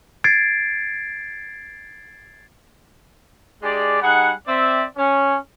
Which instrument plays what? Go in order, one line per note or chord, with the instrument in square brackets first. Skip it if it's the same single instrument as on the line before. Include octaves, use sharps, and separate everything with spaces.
[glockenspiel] G#6 A6 C7 D7
[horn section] G#3 D4 G4 G#4 D5
G3 D#4 G#4 F#5
C4 D5 E5
C#4